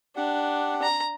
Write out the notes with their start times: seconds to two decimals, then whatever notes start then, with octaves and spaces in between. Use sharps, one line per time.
0.16 D4 G4 F#5
0.82 A#5